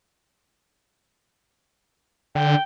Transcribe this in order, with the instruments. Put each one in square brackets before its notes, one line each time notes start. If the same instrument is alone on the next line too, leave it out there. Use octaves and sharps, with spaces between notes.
[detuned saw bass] D3 [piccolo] G5